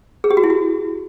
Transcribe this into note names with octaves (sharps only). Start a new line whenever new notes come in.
G#4
G4
F#4
E4
F#4